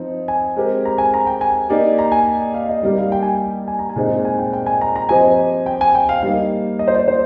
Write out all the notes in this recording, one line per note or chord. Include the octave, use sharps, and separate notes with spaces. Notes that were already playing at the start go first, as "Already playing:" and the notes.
Already playing: F3 C4 D#4
G#5
G#3 C4 G4 A#4
A#5
G#5
A#5
G5
G#5
A#3 D#4 G4 D5
A#5
G#5
F5
D#5
G3 A#3 D#4 G4 D5
F5
G5
G#5
G5
G#5
A#5
G#5
A#2 G#3 C4 D#4
G#5
G5
G5
G#5
A#5
A#5
F3 C4 G4 C5 D#5 G#5
G5
G#5
G5
F5
G3 A#3 D#4 F5
D#5
C5
D5
C5